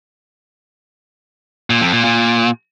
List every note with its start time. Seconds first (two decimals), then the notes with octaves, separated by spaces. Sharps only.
1.70 A#2
1.81 F2
1.93 A#2
2.04 A#2